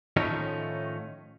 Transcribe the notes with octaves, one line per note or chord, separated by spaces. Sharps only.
A2 D#3 F3 A3 C#4 D#4